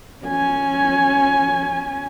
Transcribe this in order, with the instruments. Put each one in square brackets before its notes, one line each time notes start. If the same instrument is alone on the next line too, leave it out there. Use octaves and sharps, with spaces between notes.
[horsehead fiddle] C#4 G#5